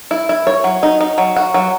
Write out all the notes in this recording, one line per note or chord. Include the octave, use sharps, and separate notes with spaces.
E4
E4
C#5
F#3
D#4
D#4
F#3
F#4
F#3